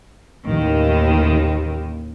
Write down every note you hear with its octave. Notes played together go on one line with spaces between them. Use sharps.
A1 D#2 D#3